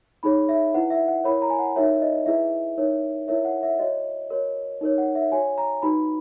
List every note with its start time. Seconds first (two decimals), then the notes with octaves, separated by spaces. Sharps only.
0.23 D#4 G#4 C#5 B5
0.49 E5
0.74 E4 B4 F#5
0.90 E5
1.08 F#5
1.24 E4 A#4 C#5 B5
1.42 A#5
1.50 G#5
1.59 F#5
1.76 D#4 F#4 A#4 C#5 E5
2.02 D#5
2.26 E4 G#4 B4 E5
2.78 D#4 A#4 C#5
3.28 E4 A#4 C#5 E5
3.45 F#5
3.63 E5
3.79 F#4 C#5 D#5
4.30 F#4 A#4 C#5
4.81 D#4 A#4 C#5
4.98 F#5
5.15 E5
5.32 F#4 C#5 G#5
5.58 A#5
5.82 D#4 F#4 B4 B5